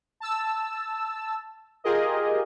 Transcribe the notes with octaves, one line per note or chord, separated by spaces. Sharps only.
A5 E6
F4 G4 G#4 A#4 D#5